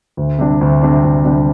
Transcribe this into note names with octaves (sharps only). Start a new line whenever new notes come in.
D2
C3 G3 D4
D2
C3 G3 D4
D2
C3 G3 D4